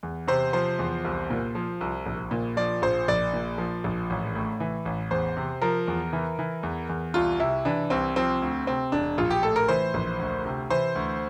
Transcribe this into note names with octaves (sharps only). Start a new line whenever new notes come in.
E2
C3 C5
F3 C5
E2
C2
A#2
F3
C2
A#1
A#2
F3 D5
A#1 C5
A#1 D5
A#2
F3
A#1
A1
A2
E3
A1
E2 C5
C3
F3 A#4
E2
E3
E3
E2
E2
C2 F4
C3 E4
E3 D4
C2 C4
F3 C4
D2
C3 C4
E1 D4
A#1 F4
G4
A2 A4
A#4
E3 C5
A#1
D2
C3
E3 C5
D2